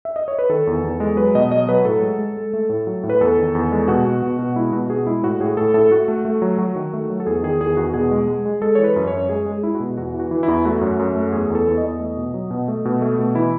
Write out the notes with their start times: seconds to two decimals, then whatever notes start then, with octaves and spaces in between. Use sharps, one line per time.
0.05 E5
0.16 D#5
0.28 C#5
0.39 B4
0.49 D#3 A4
0.67 E2
0.84 E2
1.00 G#3
1.17 F#3 B4
1.35 B2 D#5
1.51 F#3 D#5
1.69 F#3 B4
1.85 A2 A4
2.02 G#3
2.19 G#3
2.37 G#3
2.53 A3
2.69 A2
2.87 F#3
3.03 A2
3.10 B4
3.21 E2 A4
3.37 D#3
3.55 E2
3.72 G#3
3.88 B2 F#4
4.06 B2
4.22 B2
4.39 B2
4.56 G#3 E4
4.72 B2 F#4
4.89 B2 G#4
5.06 G#3 E4
5.23 A2 F#4
5.40 A2 G#4
5.57 A2 A4
5.74 A2 A4
5.91 A3 F#4
6.08 A3
6.25 A3
6.42 F#3
6.58 F#3
6.75 D#3
6.93 A3
7.10 F#3
7.20 A4
7.26 E2 G#4
7.43 D#3 G#4
7.61 E2 G#4
7.77 E2 F#4
7.94 B2 G#4
8.11 G#3
8.27 G#3
8.46 G#3
8.62 G#3 A4
8.75 E3 C#5
8.84 B4
8.96 F#2
9.07 F#2 C#5
9.29 G#3 G#4
9.46 G#3
9.52 G#4
9.63 G#3 E4
9.75 F#4
9.80 B2
9.97 E2 F#4
10.14 E3
10.20 F#4
10.31 E3
10.43 E4
10.48 E2
10.65 A3 F#4
10.81 F#2
10.99 F#2
11.16 A3
11.32 E2 G#4
11.50 E2 A4
11.67 E2
11.78 D#5
11.83 E2
12.00 A3
12.17 B2
12.34 F#3
12.51 B2
12.68 A3
12.85 B2
13.02 A3
13.19 B2
13.35 E3 E4